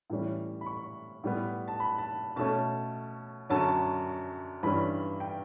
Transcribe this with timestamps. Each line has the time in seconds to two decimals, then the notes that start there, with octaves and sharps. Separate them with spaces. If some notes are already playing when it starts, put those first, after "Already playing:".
0.10 A2 E3 G3 C#4
0.61 B5
0.66 C#6
1.24 A2 G3 B3
1.68 A5
1.80 B5
1.98 A5
2.36 B2 A3 C#4 A5
3.50 F#2 D3 F#3 C#4 A5
4.63 G2 E3 G3 C#4 B5
5.20 G5